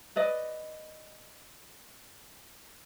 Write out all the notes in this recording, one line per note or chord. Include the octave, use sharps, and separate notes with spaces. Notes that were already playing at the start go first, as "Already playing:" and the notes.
B4 D5 D#5